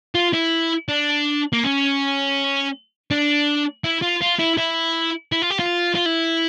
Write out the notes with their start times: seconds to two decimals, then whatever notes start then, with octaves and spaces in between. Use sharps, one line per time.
0.15 F4
0.33 E4
0.89 D4
1.53 A#3
1.64 C#4
3.11 D4
3.84 E4
4.02 F4
4.22 F4
4.39 E4
4.58 E4
5.32 E4
5.42 F4
5.50 G4
5.59 F4
5.95 F4
6.06 E4